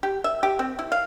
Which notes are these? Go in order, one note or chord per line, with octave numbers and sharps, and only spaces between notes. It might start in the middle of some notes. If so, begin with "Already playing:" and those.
G4
E5
G4
C4
E4
F5